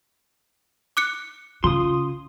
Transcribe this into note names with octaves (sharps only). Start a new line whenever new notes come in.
D6 F#6 C#7
C#3 F4 C6 D#6